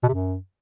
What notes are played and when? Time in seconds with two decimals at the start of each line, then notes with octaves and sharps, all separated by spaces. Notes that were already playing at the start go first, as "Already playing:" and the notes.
0.03 B2
0.08 C3
0.13 F#2